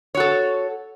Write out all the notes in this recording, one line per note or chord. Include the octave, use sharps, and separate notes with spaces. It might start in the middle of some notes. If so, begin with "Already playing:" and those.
F#4 A4 C#5